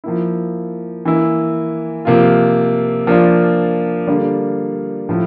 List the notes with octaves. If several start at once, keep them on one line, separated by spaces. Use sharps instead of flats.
F3 A#3 E4
E3 A#3 E4
C3 F3 A#3 F4
F3 A#3 D4 F4
D3 G3 A#3 F4
A2 F3 A3 E4